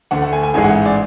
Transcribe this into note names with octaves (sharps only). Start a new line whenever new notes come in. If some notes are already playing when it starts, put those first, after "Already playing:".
D2 D3 A3 F#5
F#5
G#5
G#5
A1 G#2 E3 G#3 G#5
F#5
D5